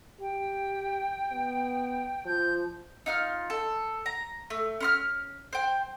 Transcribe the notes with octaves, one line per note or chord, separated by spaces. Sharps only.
G4 G5
B3
F3 G6
D#4 F4 F6
A4
A#5
A3
C#4 C6 F6
C5 G5